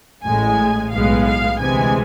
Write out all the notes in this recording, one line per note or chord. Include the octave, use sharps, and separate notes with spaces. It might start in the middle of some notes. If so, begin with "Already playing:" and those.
A1 A2 G#3 G#5
B1 A2 G#3 B3 F5
F5
D2 C3 E3 G#3 G#5